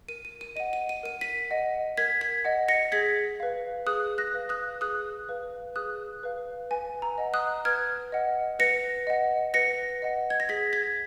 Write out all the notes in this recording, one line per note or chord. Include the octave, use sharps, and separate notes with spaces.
A#4 D#7
D#7
D#7
D#5 F#5 D#7
D#7
D#7
A#4 D#7
B6 D#7
D#5 F#5
A#4 G#6 B6
G#6 B6
D#5 F#5
A#6 C#7
G#4 G#6 B6
B4 F5
G#4 D#6 F#6
F#6 A#6
B4 F5
D#6 F#6
G#4 D#6 F#6
B4 F5
G#4 D#6 F#6
B4 F5
B4 G#5
A#5
D#5 F#5
D#6 F#6
B4 F6 G#6
D#5 F#5
B4 A#6 C#7
D#5 F#5
B4 A#6 C#7
D#5 F#5
G#6
A#6
G#4 G#6 B6
G#6 B6